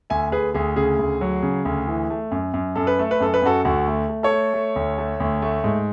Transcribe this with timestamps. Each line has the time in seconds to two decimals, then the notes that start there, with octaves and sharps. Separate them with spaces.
0.10 D2 E5 G#5
0.32 D2 G#4 B4
0.54 D2 G#4
0.76 C#3 G#4
0.99 D2
1.21 F#3
1.43 C#3
1.65 D2
1.87 E3
2.10 A3
2.31 F#2
2.54 F#2
2.76 F#2 A4
2.87 B4
2.99 A3 A4
3.11 B4
3.20 F#2 A4
3.34 B4
3.42 F#2 F#4 A4
3.65 D2 F#4 A4
3.87 A3
4.09 A3
4.23 A4 C#5
4.31 A3
4.54 A3
4.76 D2
4.98 A3
5.20 D2
5.42 A3
5.64 G#2